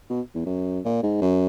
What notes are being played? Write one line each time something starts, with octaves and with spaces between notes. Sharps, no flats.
B2
E2
F#2
A#2
G#2
F#2